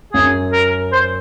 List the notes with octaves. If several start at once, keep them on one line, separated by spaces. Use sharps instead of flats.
F#2 G#4
A#4
C5